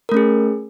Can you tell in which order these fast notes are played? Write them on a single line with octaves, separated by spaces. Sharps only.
A#4 A3 C#4 G#4